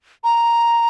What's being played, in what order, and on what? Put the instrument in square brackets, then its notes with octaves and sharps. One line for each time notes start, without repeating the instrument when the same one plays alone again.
[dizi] A#5